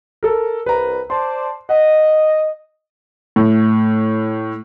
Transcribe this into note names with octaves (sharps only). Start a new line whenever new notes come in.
A4 A#4
C2 B4 A#5
C5 D5 A5 C6
D#5 F#5
A2